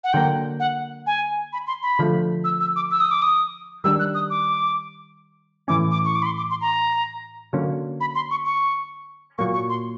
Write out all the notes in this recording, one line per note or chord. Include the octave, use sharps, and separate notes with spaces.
F#5
D3 F#3 A#3 G5
F#5
G#5
B5
C6
B5
D3 F3 A3
E6
E6
D6
E6
D#6
D6
D#6
D#3 G3 A#3 D4 E6
F#6
D#6
D6
A2 E3 A3 C#4 D6
D6
C#6
D6
B5
C6
D6
C6
A#5
D3 F#3 A#3 C#4
B5
C6
C#6
C#6
A#2 F#3 A#3 C#6
C#6
C6